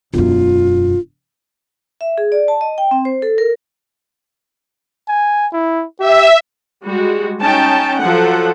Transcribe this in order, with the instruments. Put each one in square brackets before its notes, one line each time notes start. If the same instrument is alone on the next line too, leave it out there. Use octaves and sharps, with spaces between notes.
[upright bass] E1 F#2 [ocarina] F4
[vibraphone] E5
G#4
D5
A5
D#5
G5
C4
C5
A4
A#4
[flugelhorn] G#5
E4
[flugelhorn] G4 [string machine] E5
[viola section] G3 G#3 F#4
C#4 D#4 G5 A5
F3 F#3 A4 F#5